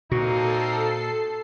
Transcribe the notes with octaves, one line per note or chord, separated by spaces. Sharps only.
A#2 A#3 C4 D#4 F#4 A4 C7